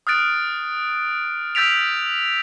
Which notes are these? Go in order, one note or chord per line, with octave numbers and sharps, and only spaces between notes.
D#6 F6 F#6 A6 D7
E6 G6 A6 B6 D7 F7